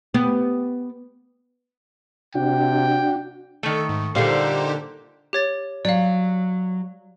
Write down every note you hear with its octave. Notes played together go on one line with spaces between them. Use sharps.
B3 G4
C3 D4 F#4 G5
D#3 A3 A4
G#2
A#2 D3 G3 D#4 G4 C5 F5
G4 C#5 A6
F#3 D5 F5